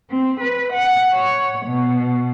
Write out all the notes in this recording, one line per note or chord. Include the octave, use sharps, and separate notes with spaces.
C4
B4
F#5
C#5
B2